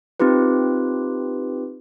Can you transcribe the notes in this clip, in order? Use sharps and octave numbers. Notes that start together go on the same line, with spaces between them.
C4 D#4 F4 G4 B4